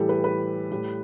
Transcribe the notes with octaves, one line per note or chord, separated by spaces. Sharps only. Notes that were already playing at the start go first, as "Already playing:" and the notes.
Already playing: A2 E3 G3 G4 A4
B4
B4
A2 G3